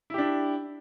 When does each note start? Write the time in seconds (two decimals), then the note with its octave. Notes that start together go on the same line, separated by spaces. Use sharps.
0.10 E4
0.14 G4
0.18 D4